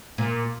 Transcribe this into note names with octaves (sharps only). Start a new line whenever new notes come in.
A#2